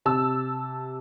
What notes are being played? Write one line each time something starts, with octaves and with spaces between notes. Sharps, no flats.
C3 A5 E6